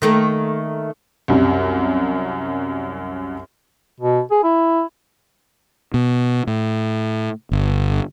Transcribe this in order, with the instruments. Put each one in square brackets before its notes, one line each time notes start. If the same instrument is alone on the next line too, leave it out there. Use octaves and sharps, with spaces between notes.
[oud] D#3 A3 A#3
[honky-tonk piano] C2 F#2 G3
[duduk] B2
G#4
E4
[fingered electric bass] B2
A2
G1